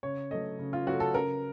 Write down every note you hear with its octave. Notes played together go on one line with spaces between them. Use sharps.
C#3 C#5
F#3 A3 D#5
C#3
F4
F#3 A3 F#4
A4
C#3 A#4